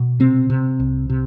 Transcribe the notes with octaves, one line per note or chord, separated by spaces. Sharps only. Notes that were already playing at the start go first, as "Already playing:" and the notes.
Already playing: B2
C3 C4
C3
C2
C3